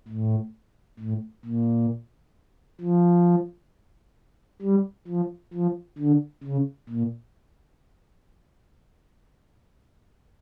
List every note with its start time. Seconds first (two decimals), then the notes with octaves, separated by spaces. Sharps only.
0.08 A2
1.00 A2
1.45 A#2
2.81 F3
4.62 G3
5.07 F3
5.53 F3
5.98 D3
6.43 C#3
6.89 A#2